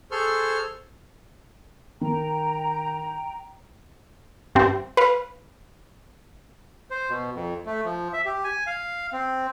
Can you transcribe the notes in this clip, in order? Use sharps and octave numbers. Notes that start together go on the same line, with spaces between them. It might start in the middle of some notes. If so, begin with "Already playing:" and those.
G#4 A4 C5 C6 C#6 F6
D#3 G5 A#5
G2 C4
B4 F5
C5
B2
F2
A3
F3
E5
G4
G#5
F5
C4